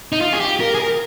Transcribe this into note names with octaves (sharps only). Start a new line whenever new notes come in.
D#4
F4
G#4
G4
A#4
G#4
A#4